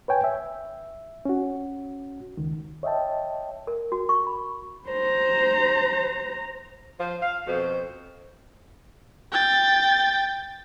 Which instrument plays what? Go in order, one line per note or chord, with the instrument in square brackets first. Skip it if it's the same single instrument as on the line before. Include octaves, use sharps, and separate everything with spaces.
[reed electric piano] B4 C#5 G5 G#5
E5
C#4 F#4
C#2 D#3
C#5 D#5 E5 G5 A5
[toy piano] A#4
F#4
C#6
B5
[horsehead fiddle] C5 A#5
[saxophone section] F3 C5
F5
F2 B2 F#4 C5
[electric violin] G5 A6